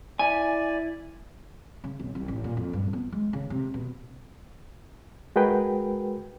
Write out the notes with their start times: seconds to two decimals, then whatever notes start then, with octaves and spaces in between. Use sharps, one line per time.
0.19 E4 D5 G#5
1.84 C#3
1.99 B1
2.15 C2
2.28 A1
2.44 A#2
2.57 F2
2.73 G2
2.93 B3
3.12 G#3
3.33 C#3
3.50 C3
3.74 B2
5.36 G#3 F#4 G#4 A#4 B4 G5